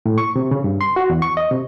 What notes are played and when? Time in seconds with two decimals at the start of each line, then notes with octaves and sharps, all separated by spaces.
0.06 A2
0.18 C#6
0.36 C3
0.51 C#3
0.64 G2
0.81 C6
0.96 F#4
1.10 E2
1.22 C#6
1.37 D#5
1.51 C3